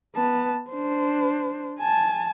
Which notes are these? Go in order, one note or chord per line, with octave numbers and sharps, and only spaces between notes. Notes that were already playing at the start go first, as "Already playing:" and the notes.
B3 A5
D4 C5
G#5 A5